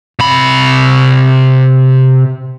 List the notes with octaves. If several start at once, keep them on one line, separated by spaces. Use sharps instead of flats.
C3 B5